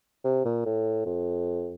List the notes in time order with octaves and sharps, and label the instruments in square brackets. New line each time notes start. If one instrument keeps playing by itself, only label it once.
[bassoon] C3
A#2
A2
F2